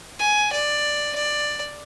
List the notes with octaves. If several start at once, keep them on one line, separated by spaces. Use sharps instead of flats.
G#5
D5
D5